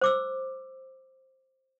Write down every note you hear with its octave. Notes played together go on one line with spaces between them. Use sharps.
C5 D6 E6